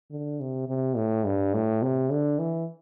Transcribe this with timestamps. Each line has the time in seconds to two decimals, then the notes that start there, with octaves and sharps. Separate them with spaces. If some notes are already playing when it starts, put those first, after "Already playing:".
0.11 D3
0.40 C3
0.69 C3
0.96 A2
1.25 G2
1.54 A2
1.83 C3
2.10 D3
2.39 E3